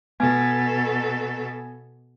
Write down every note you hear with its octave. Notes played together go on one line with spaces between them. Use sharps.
B2 B3 A4 G#5 G#6